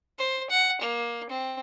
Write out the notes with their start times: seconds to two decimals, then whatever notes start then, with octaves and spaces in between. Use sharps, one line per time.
0.19 C5
0.50 F#5
0.81 A#3
1.29 C4